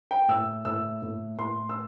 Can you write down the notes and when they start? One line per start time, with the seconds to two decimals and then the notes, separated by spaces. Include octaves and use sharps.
0.11 G5
0.28 A2 E6
0.65 A2 E6
1.02 A2
1.38 A2 C6
1.69 E6